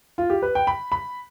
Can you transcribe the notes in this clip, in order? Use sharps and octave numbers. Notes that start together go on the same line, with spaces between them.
F4
G4
B4
G5
B5
B5